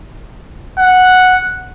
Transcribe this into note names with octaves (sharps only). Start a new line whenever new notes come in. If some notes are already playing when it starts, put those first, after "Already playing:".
F#5